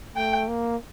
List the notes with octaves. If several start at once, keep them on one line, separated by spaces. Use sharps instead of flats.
A3 G5
A#3